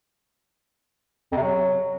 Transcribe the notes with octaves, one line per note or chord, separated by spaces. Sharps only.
F2
C3
F#3